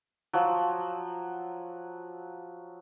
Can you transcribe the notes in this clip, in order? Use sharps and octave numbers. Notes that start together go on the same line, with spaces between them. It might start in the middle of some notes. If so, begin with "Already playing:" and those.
F3 F#3